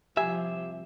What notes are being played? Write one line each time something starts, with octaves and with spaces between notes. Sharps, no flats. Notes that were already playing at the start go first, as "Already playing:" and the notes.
C2 F3 G4 E5 G#5